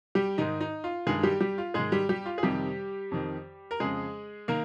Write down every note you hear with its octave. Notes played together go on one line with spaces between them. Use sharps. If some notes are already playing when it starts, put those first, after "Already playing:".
G3 G4
G#2 D#3 D#4
D#4
F4
G2 D#3 G#3 G#4
G3 G4
G3 G4
F4
G#2 D#3 G#3 G#4
G3 G4
G3 G4
F4
G#4
F2 C3 D#3 G3 G4
F2 D#3
A#4
F2 C#3 G#3 G#4
D#3 A#3 A#4